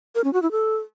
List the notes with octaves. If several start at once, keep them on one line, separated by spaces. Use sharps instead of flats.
A#4
C#4
F#4
E4
A4